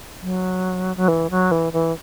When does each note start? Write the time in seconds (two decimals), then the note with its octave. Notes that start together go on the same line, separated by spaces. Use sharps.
0.22 F#3
0.97 F#3
1.08 E3
1.30 F#3
1.51 E3
1.73 E3